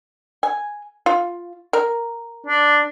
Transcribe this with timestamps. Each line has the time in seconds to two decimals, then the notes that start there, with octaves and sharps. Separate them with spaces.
0.43 G#5
1.06 F4
1.73 A#4
2.46 D4